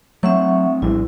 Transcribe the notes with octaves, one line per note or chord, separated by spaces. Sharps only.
F#3 A3 C4 E5 F#5 C#6
A#1 A2 G3 E4